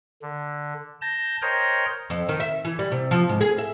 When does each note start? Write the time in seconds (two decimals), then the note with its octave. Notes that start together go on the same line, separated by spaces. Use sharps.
0.22 D3
1.02 A5 G6 A#6
1.42 A#4 C5 C#5 D#5 G5 A#5
2.10 F2
2.29 D#3
2.40 E5
2.65 E3
2.79 G3
2.92 C3
3.11 F3
3.29 G#2
3.41 G#4
3.58 E5